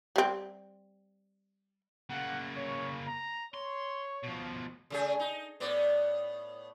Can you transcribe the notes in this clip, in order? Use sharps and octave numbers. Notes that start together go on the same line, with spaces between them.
G3 C4
C#3 A#3 F#5
C#5
A#5
C#5 C6
B2 F3
C#3 A3 G#4
D#4
A2 B3 D5